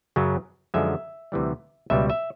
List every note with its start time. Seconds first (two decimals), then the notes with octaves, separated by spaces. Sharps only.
0.16 F#2 C#3 F#3
0.74 F#2 D3 F3 G#3 E5
1.32 D2 C3 E3 G3
1.90 C#2 B2 G3 E5
2.10 E5